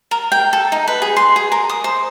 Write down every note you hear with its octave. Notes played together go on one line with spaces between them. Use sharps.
A#4
G5
A4
D#4
B4
G#4
C6
G#4
A#4
D#6
C5